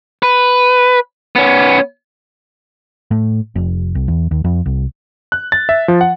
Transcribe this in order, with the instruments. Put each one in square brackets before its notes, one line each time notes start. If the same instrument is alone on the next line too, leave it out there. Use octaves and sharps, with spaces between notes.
[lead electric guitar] B4
B3 C#4
[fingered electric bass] A2
F1
C2
E2
D#2
F2
C2
[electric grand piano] F#6
A6
E5
F3
F#5